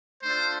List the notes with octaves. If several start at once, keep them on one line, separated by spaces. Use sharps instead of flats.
A3 D4 F4 C5